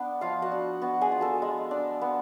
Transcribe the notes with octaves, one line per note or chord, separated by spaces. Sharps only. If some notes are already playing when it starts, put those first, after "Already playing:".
Already playing: B3 D4
F3 F4 F5
F#4 F#5
D4
B3 F#4 F#5
G#4 G#5
F4
A4 A5
G#3
D4
B3